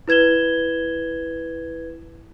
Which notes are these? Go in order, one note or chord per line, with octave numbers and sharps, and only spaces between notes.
E4 B4 G#6 E7 G7